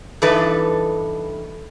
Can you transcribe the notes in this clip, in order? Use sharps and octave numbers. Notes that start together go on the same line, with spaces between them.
G2 E3 D#4 A4 B4